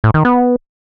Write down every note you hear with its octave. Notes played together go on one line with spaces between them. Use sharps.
A2
D#3
B3